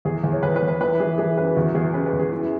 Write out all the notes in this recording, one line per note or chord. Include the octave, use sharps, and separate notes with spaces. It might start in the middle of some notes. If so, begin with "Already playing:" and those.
E2 G#4
E2
C#5
E2 B4
B4
E2
B4
E3 B4
E3 G#4
E3 G#4
F#2 B4
E2 F#4
E2 G#4
C#3 B4
B4
E2
G#4
F#2 E4